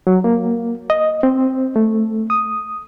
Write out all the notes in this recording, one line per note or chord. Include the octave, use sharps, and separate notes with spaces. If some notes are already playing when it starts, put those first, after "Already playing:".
F#3
A#3
D#5
C4
A3
D#6